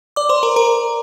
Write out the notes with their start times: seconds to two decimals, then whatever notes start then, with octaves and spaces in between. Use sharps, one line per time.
0.16 D5 D6
0.29 C5 C6
0.43 A#4 A#5
0.56 A#4 A#5